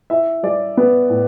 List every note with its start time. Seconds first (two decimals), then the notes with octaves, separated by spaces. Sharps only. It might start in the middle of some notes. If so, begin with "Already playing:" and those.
0.10 E4 E5
0.43 G3 D5
0.77 B3
1.10 A2